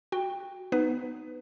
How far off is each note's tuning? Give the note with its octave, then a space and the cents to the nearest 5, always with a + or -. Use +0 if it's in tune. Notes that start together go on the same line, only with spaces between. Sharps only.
F#4 +0 G5 +15
B3 +0 D#4 -5 B4 +20